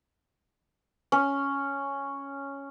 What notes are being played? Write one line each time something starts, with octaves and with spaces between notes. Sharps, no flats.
C#4